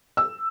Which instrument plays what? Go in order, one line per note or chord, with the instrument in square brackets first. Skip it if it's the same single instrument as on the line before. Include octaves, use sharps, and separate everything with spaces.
[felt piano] E6